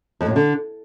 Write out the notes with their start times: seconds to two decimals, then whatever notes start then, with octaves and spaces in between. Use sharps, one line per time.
0.21 F2
0.26 A2
0.31 F#2
0.36 D3